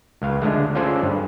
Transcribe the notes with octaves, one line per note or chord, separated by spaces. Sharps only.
C#2 F5
D3 G#3 A3
C#4 F4 G#4 A4 C5 D5
G2